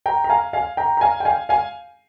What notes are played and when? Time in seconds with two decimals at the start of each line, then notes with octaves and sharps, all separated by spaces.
0.06 G5 A#5
0.24 A#5
0.29 F5 G#5
0.53 F5 G#5
0.77 G5 A#5
0.97 A#5
1.01 F5 G#5
1.20 G5
1.25 F5 G#5
1.49 F5 G#5